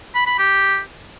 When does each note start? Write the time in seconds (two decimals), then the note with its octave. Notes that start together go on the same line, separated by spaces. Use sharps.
0.15 B5
0.27 B5
0.39 G4